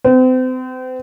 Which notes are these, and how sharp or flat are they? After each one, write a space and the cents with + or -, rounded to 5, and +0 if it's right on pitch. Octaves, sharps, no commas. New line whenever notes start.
C4 -35